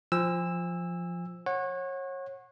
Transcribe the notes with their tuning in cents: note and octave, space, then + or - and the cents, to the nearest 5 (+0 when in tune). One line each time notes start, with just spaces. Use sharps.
F3 +0 G#5 -35 E6 +0
C#5 -30 F#5 -10